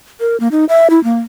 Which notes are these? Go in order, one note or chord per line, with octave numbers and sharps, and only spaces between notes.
A#4
A#3
D#4
E5
E4
A#3